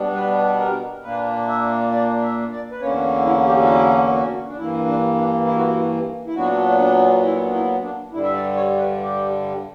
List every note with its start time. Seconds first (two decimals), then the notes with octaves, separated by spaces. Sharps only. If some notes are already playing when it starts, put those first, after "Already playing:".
Already playing: B2 G3 B3 D4
0.15 B4
0.59 A#4
1.03 A#2 A#3 D4 B4
1.48 E5
1.91 D5
2.22 E5
2.51 D5
2.71 B4
2.80 E2 D3 A#3 C#4 C#5
3.25 E4
3.46 G4
3.63 F#4
3.69 E4
4.13 F#4
4.47 D4
4.57 G2 E3 A#3 E4
4.87 D4
5.17 D4
5.45 E4
5.56 F#4
5.66 E4
6.26 E4
6.35 A#2 F#3 B3 D4 F#4
6.79 D4
7.23 E4
7.46 D4
7.53 E4
7.82 D4
8.11 G2 D3 G3 E4
8.23 E5
8.34 D5
8.56 C#5
8.78 B4
9.01 G4